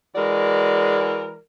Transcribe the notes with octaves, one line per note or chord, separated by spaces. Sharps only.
E3 G#3 F#4 A#4 D5